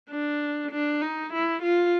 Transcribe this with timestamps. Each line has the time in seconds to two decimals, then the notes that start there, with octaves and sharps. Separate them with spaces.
0.10 D4
0.71 D4
1.02 D#4
1.33 E4
1.63 F4